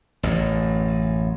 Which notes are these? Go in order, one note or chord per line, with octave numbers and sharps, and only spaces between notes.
A1 F#2